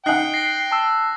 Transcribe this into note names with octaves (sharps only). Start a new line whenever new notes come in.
D#4 F#5 G5 F#6 C7 F#7
A#6 C7
A5 E6